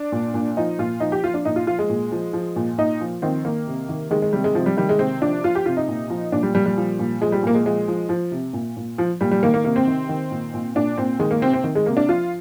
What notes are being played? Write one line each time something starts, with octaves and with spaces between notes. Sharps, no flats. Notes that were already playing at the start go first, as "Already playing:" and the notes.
Already playing: D4
A#2
A#2
F3 D#4
A#2 F4
F3 D#4
G4
F3 F4
D4
A#2 D#4
F4
F3 F4
G#3
A#2
F3
F3
A#2
A#2 D#4
F3
D#3 C4
D#3 A#3
C3
D#3
D#3 G#3
G#3
C3 G3
G#3
C3 F3
G3
D#3 G3
G#3
C3 C4
F3 D4
F3 F4
G4
C3 F4
D#4
A#2
F3
A#2 D4
G3
A#2 G3
G3
F3
A#2
F3 G#3
G3
A#2 A#3
G#3
F3 G#3
F3
F3
C3
A#2
A#2
F3
A#2 G3
G3
D#3 A#3
A#3
C3 A#3
C4
D#3
D#3
A#2
A#2
A#2 D4
A#2 C4
D#3 G#3
A#3
C3 C4
C4
D#3
G#3
C3 A#3
D4
F3 F4